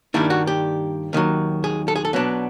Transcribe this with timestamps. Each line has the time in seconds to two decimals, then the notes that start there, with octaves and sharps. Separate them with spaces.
0.14 G2 D#3 G3 A#3 D4 E4
0.30 F#4
0.47 G4
1.13 D#2 D#3 F#3
1.64 G#4
1.88 A4
1.96 G#4
2.05 A4
2.13 B2 F#3 B3 D4